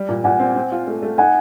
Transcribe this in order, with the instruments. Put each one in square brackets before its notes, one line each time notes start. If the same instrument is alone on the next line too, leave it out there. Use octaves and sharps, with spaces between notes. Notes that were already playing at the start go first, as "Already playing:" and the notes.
Already playing: [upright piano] G3
A#2
[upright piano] A#2 [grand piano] F#5 G#5
[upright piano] C4
C4
F4
A3
A3
[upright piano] D#4 [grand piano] F#5 G#5